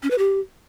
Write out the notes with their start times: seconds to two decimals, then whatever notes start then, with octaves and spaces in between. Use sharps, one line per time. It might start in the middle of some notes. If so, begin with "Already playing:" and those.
0.03 C#4
0.11 B4
0.18 G4